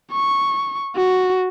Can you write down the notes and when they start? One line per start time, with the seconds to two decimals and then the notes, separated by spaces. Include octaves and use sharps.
0.12 C#6
0.96 F#4